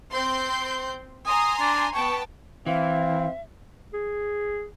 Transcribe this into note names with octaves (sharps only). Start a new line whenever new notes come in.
C4 C6 G6
G#5 A#5 C6 D#6
D4
B3 G5 A5 C#6
E3 C4 E5 F5
G#4